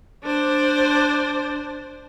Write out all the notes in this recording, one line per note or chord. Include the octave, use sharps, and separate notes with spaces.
D4 C5